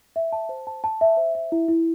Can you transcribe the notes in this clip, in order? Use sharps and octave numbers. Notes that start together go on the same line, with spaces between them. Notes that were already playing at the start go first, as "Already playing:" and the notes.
E5
A5
C5
A5
A5
E5
C5
E5
E4
E4